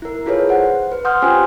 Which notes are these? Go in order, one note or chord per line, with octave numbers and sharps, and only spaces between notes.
E4 A#4
E4 F4 G#4 A4 B4 C#5
C5 F#5
B4
F#5 C6 D#6 F6 G6
C#4 F4 G4 C5 G5 G#5